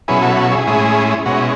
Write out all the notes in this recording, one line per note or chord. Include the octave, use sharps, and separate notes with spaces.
B2 F#3 C#4 E4 G#4 B4
F#4 A4
F#4 A4
E4 G#4
A2 G#3 C#4 E4
B2 G#3 C#4 F#4
E4